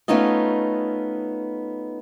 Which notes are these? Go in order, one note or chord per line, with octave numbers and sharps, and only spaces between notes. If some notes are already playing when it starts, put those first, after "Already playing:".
A3 B3 C#4 D#4 F4 D#5